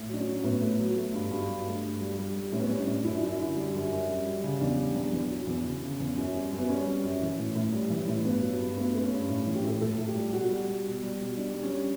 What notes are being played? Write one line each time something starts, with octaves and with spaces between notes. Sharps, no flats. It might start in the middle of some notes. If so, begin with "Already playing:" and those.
Already playing: A2
F#3 D4
C#4
F#3
A2 B3
A3
F#3
A3
G2
G2
F#3
A3
G2
G3
G3
G3
A2 C#4
B3
G3 C#4
D4
A2
F#2 E4
D4
F#2 E4
D3
G3
F#2
F#2
G3
G3
C#3
E2 D4
G3
E2
E2
F#3
E2
C#3
C#3
E2
F#2 C#4
G3
F#2
B3
G3 C#4
G3
F#2
E3
A2
A2
G3
E3
A2
G2 B3
F#3
G2
A3 B3
A3 B3
C#4
G2
A2
E3 C#4
G4
A2 A4
A2 A4
A2
G4
G3
B2 F#4
G3
G3
B2
G3
B2
G3 D4
G3
C#4
G3